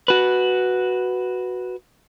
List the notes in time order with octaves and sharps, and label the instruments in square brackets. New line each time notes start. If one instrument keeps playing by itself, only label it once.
[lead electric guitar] F#4 B4